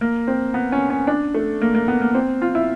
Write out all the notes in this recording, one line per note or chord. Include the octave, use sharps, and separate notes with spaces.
A#3
C4
B3
C#4
C#4
D4
A3
A#3
A#3
B3
A#3
C4
F4
E4